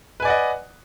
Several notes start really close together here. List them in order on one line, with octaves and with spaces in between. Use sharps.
B4 G#5 D5 F#5 D#5